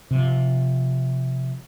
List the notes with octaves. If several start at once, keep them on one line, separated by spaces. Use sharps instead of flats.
C3 F3